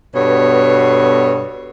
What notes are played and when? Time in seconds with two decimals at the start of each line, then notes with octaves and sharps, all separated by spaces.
0.15 G2 B2 B3 A4 C#5